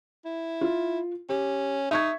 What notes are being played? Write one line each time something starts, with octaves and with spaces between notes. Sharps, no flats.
E4
F4
C#4 G4
D#4 E5 C#6 G#6